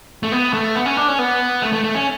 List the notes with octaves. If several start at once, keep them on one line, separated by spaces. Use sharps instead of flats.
A3
B3
A3
B3
C#4
D4
C#4
B3
A3
A3
A3
C#4